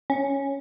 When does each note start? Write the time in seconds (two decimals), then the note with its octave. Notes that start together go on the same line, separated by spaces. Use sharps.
0.10 C#4